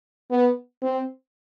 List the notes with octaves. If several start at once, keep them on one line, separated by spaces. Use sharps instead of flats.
B3
C4